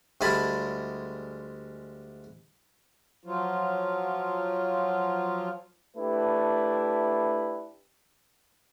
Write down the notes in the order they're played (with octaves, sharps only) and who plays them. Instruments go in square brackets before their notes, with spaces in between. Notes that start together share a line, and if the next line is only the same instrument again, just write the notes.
[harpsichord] D2 G3 G#3 G#5 A5 B5
[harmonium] F3 F#3 F4
[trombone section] A3 D4 E4 G4 B4